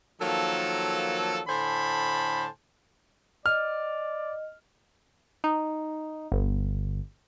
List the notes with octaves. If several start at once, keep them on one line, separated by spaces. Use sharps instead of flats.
D#3 F3 F#3 A#3 A4
A2 D3 C5 G#5 A5 B5
D5 D#5 F6
D#4
G1